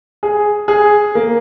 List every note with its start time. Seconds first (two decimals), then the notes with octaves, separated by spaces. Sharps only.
0.23 G#4
0.68 G#4
1.15 A#3